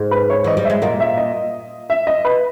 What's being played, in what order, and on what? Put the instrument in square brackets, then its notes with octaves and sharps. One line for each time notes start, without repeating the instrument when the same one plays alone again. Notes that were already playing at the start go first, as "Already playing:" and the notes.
Already playing: [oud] G#2 G#3
[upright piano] B4
C#5
[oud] E3 [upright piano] D#5
[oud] G3
[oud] G#3 [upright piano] E5
[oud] A#2 A#3 [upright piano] D#5
[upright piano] E5
D#5
E5
D#5
B4